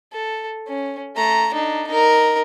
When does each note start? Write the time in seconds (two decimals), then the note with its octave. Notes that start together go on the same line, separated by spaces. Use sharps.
0.13 A4
0.68 C#4
1.16 A3 A#5
1.53 D4 D#4
1.87 D#4 A#4